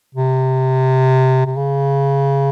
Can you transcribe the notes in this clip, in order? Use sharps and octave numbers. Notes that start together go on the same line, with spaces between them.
C3
C3
C#3